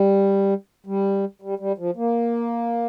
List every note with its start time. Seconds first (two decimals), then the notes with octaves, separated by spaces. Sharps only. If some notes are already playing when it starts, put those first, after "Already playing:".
Already playing: G3
0.87 G3
1.42 G3
1.60 G3
1.78 F3
1.97 A#3